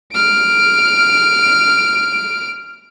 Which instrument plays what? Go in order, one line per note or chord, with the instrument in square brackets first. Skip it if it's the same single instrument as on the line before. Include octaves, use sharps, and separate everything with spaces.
[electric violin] F6 D7